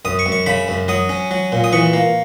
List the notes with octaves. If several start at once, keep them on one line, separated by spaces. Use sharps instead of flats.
F#2 D#6
C#6
F#2
C#6
C#3 B5
F#2
F#3 D#6
C#4
F#3
A#2
D#6
E3 C#6
A#3